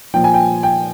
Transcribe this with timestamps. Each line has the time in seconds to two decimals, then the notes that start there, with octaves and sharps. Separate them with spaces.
0.14 A#2 F3 G5
0.24 G#5
0.34 G5
0.63 G5